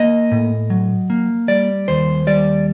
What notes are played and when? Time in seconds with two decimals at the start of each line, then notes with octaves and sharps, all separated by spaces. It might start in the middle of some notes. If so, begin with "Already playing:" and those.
Already playing: A#3 D#5
0.31 A2
0.70 F#3
1.10 A#3
1.48 G3 D5
1.88 D#2 C5
2.27 G3 D5